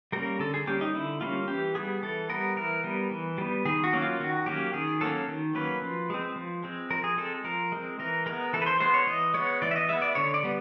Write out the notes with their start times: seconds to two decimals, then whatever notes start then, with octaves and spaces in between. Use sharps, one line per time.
0.12 G3 A#3 C#4 A#4
0.39 D3 A4
0.54 G#4
0.67 G3 A#3 C#4 G4
0.81 D#4
0.95 D3 E4
1.21 G3 A#3 C#4 F4
1.48 E3 G4
1.75 G3 B3 G#4
2.02 E3 A4
2.30 G3 B3 A#4
2.57 E3 A#4
2.84 G3 B3
3.11 E3
3.38 G3 B3
3.65 D#3 G#4
3.84 F#4
3.93 F#3 A#3 C#4
4.02 F4
4.20 D#3 F#4
4.46 F#3 A#3 C#4 G4
4.73 D#3 G#4
5.01 F#3 A#3 C#4 A4
5.28 D#3
5.55 F#3 A#3 C#4 B4
5.82 F3
6.10 G#3 C4
6.36 F3
6.64 G#3 C4
6.90 F3 A#4
7.04 G#4
7.17 G#3 C4 A4
7.44 F3 A#4
7.72 G#3 C4
7.99 E3 A#4
8.26 G#3 B3 A#4
8.53 E3 A4
8.62 B4
8.66 C5
8.80 G#3 B3 C5
8.94 C#5
9.07 E3 D#5
9.34 G#3 B3 C#5
9.62 E3 D5
9.71 E5
9.76 D#5
9.89 G#3 B3 E5
10.02 D5
10.15 D3 C#5
10.34 D5
10.43 G3 B3